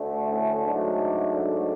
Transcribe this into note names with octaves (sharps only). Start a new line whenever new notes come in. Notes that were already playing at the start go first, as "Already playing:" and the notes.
Already playing: D2 D3 A3 D4
C#4 E4
G#2 F#3 A3 D4
D4